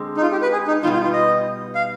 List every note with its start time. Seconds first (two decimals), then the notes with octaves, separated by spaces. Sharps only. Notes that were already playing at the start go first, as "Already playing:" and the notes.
Already playing: D3 G#3 C4
0.17 D#4
0.22 F4
0.32 G4
0.42 B4
0.52 G#4
0.68 D#4
0.83 B2 G3 B3 D#4 F4
0.93 F4
1.04 F4
1.13 D#5
1.75 F5